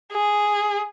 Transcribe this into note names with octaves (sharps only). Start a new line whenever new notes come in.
G#4